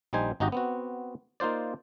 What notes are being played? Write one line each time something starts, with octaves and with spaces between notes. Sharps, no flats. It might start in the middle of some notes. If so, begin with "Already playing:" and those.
A#1 G3 D#4 C5 G#5
G#1 D#4 F#4 G4 D#5
B3 C4 F#4
A#3 D#4 F4 C5 D5